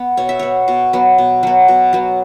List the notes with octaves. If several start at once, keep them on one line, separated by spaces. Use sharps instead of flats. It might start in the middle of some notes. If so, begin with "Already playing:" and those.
Already playing: B3
B2 C#5
E5
B3 C#5
B2
F#3 B3
B2
F#3 B3
B2
F#3 B3